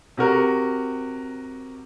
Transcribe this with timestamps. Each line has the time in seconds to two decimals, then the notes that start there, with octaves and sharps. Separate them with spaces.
0.17 C3 F#4 A#4